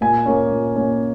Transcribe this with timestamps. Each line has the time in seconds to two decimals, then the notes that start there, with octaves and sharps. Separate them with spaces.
0.01 A#2 G#5
0.26 A#3 C#4
0.51 A#2
0.76 A#3 C#4